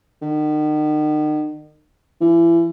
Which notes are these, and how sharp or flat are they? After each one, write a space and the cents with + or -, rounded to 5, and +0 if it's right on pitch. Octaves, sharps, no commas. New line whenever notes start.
D#3 -40
E3 +30